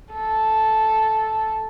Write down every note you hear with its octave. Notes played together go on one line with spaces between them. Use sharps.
A4